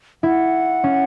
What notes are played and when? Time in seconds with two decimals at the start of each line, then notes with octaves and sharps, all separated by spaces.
0.23 E4 F#5
0.84 C#4